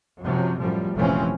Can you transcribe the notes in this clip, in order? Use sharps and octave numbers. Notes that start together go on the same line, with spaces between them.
F#2 C3 F3 F#3
F#2 A2 F3 G3
F1 A#1 E3 F3 C4 C#4